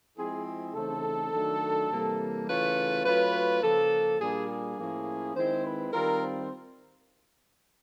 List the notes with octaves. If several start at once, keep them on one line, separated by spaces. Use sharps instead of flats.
F3 G#3 C4 E4 G#4
G#4
C#3 E3 A3 C4 D#4 A4
D#3 F#3 A3 D4
C3 E3 G3 A#3
C#3 E3 A3 C#4 F4 B4
F#3 A3 C#4 F4 B4
C#3 F3 A#3 A4
A#2 G3 A#3 D4 G#4
G#4
A2 F3 A#3 C#4 E4
D#3 G#3 C4 E4 C5
B4
D#3 G3 C4 F4 A#4
C5